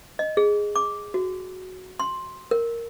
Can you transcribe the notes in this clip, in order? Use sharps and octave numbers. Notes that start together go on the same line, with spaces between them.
D#5
G#4
D6
F#4
C6
A#4